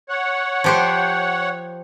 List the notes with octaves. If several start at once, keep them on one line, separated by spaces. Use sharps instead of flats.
C#5 F#5
F3 G4 C5